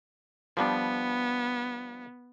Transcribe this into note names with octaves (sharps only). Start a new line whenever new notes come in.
F3 G3 B3 D4